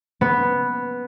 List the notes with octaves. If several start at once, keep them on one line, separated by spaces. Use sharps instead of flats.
B3